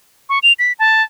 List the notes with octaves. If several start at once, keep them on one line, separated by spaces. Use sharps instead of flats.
C#6
F7
B6
A5